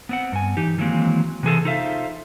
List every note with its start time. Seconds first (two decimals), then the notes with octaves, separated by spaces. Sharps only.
0.09 B3 C4 F#5
0.32 G2 G#5
0.57 E3 D#4 G4
0.78 D#3 E3 F#3 G#3 A#3 C4
1.43 C3 E3 G#4 A4
1.65 D#4 F4 A4 C5 E5 F5